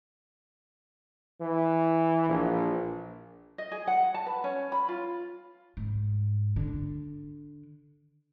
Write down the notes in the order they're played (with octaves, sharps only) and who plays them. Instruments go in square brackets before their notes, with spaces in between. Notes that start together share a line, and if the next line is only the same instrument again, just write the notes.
[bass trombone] E3
A#1
[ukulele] D#5
G#4
F#5
A5
B4
C#4
B5
F4
[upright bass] G#2
D3